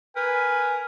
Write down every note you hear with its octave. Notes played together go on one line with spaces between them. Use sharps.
A#4 B4 G#5